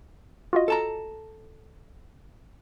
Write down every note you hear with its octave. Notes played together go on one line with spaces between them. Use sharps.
F4 F#4 D#5
A4 A5 A#5